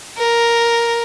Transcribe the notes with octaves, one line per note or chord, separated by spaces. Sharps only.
A#4